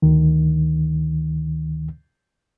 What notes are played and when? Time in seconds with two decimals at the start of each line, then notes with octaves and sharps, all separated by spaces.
0.02 D2 D#3